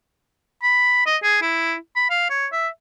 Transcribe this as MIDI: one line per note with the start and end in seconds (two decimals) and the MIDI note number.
0.63 1.02 83
1.06 1.17 75
1.23 1.38 68
1.42 1.75 64
1.96 2.06 83
2.10 2.27 77
2.30 2.47 73
2.52 2.68 76